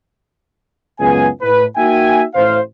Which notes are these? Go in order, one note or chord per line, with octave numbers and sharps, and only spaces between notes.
C#2 F#2 B3 G#4 G#5
A2 B4
A#3 D#4 F#4 E5 G5 G#5
A1 C5 F5